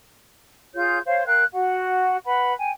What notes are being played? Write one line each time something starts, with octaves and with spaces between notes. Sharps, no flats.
F4 G#4 C#5 G6
C5 C#5 F5
A#4 F5 G5 F#6
F#4 F#5
B4 F#5 B5
G5 G#5